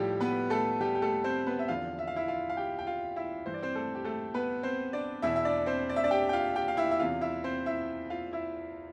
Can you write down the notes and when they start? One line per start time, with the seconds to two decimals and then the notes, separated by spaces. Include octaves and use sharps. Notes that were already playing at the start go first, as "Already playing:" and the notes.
Already playing: A2 F3 G3 G4
0.21 B3 B4
0.50 A3 A4
0.81 G3 G4
0.95 G4
1.02 A3 A4
1.24 C4 C5
1.47 B3 B4
1.59 E5
1.68 E2 D3 F3 F4 F5
1.99 E5
2.07 F5
2.16 E4 E5
2.28 F4 F5
2.50 F5
2.57 G4 G5
2.79 G5
2.87 F4 F5
3.16 E4 E5
3.46 G2 E3 C5
3.54 D5
3.62 C4 C5
3.75 A3 A4
3.95 G4
4.04 A3 A4
4.34 B3 B4
4.63 C4 C5
4.93 D4 D5
5.22 E2 B2 E4 E5
5.36 E5
5.45 D4 D5
5.66 C4 C5
5.89 D5
5.96 E5
6.04 D4 D5
6.11 G4 G5
6.29 G5
6.33 F4 F5
6.55 G4 G5
6.68 F5
6.77 E4 E5
6.91 E5
6.99 E2 C3 E3 F4 F5
7.21 E4 E5
7.44 C4 C5
7.66 E4 E5
8.10 F4 F5
8.33 E4 E5